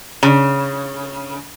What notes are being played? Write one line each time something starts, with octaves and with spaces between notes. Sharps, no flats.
C#3